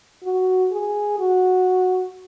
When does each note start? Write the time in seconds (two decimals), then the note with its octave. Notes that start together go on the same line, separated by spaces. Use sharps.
0.24 F#4
0.72 G#4
1.19 F#4